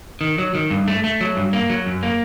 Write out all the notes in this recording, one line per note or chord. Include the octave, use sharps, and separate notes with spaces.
D#3
F#3
D#3
G2
A3
A3
F#3
G2
A#3
F#3
F#2
A#3